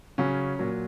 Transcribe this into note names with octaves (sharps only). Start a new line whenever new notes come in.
C#3 F#3 C#4
A#2 F#3